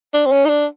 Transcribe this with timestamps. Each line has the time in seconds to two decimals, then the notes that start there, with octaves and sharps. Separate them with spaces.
0.14 D4
0.26 C4
0.32 C#4
0.45 D#4
0.49 D4